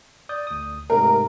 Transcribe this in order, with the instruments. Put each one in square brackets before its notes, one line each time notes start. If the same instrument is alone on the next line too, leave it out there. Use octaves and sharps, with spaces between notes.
[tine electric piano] D5 D#6 G6
D2 D#6
[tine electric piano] G#2 C3 A3 [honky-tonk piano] A#4